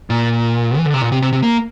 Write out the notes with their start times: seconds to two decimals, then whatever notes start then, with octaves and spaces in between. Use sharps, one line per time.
0.10 A#2
0.77 E3
0.86 D3
0.94 C3
1.02 A#2
1.12 C3
1.22 C3
1.33 C3
1.42 A#3